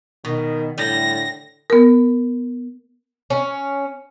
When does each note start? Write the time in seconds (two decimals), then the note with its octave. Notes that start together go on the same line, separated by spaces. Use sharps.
0.25 B2 D#3
0.78 A2 D3 G3 A#6
1.70 B3 A#4
3.30 C#4